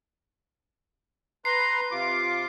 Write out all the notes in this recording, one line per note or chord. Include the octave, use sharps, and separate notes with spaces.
B4 A#5 C6 C7
C3 F4 D6